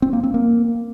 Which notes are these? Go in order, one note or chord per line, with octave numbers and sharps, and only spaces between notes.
C4
A#3
C4
A#3